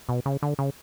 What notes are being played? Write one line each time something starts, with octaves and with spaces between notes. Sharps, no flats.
B2
C#3
D3
C#3